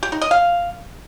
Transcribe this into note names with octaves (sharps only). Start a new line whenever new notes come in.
G4
D#4
D#5
F5